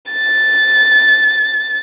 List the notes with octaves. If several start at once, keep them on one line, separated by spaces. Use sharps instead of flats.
A6